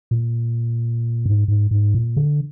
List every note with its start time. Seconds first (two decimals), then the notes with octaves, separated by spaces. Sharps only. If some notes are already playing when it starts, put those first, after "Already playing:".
0.11 A#2
1.26 G#2
1.48 G#2
1.71 G#2
1.94 A#2
2.17 D3